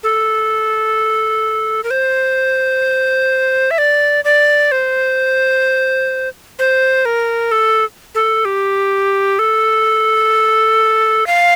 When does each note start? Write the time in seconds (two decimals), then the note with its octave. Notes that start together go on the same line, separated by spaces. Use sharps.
0.03 A4
1.84 A#4
1.90 C5
3.71 E5
3.78 D5
4.25 D5
4.72 C5
6.59 C5
7.05 A#4
7.52 A4
8.15 A4
8.45 G4
9.39 A4
11.27 F5